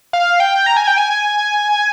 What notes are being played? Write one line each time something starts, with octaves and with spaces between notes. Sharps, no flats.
F5
G5
A#5
G#5
G5
G#5